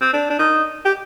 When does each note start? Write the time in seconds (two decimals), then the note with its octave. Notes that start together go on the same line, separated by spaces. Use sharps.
0.01 C4
0.13 D4
0.30 D4
0.39 D#4
0.85 G4